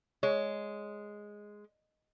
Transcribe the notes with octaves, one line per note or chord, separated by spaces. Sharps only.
G#3 C#5